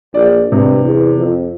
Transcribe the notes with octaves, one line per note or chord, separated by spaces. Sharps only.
A#1 D5
G2 C3
E2
F2